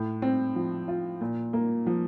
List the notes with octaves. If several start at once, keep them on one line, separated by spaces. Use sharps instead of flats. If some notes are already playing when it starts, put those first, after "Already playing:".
Already playing: A2
C4
F3
F4
A#2
A#3
F3